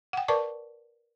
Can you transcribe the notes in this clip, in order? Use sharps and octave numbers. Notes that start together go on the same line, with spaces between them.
F#5 G5
A#4 B4 D5 A5 C#6 D6